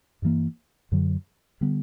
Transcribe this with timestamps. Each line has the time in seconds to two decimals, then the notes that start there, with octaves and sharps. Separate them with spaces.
0.22 G2 E3 A#3
0.92 F#2 D3 F#3
1.61 D3 G3 B3